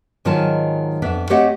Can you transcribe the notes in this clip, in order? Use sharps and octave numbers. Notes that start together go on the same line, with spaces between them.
G#2 D#3 F#3 F4 G#5 A5
F2 B3 D4 E5
A3 C4 G4 C#5 D#5 F#5